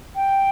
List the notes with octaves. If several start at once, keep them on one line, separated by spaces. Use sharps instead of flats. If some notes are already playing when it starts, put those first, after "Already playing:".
G5